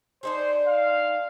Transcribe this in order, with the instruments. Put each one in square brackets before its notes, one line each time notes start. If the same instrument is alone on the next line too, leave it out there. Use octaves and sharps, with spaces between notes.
[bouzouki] D4 D#4 G#4 [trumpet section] C5
[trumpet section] F5